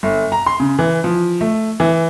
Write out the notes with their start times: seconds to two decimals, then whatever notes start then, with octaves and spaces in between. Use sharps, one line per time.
0.03 G1
0.32 A#5
0.46 C6
0.60 C#3
0.79 E3
1.04 F3
1.41 A3
1.80 E3